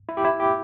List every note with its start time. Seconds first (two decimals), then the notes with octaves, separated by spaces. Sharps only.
0.09 E4
0.17 G4
0.25 E4
0.40 G4